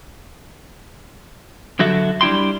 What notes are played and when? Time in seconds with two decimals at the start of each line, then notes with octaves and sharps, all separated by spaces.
1.79 D3 F#3 F#4 A4 E5
2.21 G3 D4 E4 G5 C6